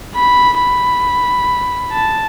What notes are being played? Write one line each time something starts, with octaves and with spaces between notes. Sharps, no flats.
B5
B5
A5